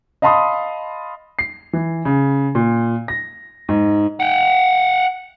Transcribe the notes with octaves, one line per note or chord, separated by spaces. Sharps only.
D#5 F5 A5 B5 C6 D#6
C7
E3
C#3
A#2
A#6
G#2
F#5 G5